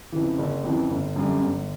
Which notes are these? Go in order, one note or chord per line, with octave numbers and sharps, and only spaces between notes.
F2 C#3 E3
F#1
F2 C#3 E3
G1
F#2 D3 G3
G1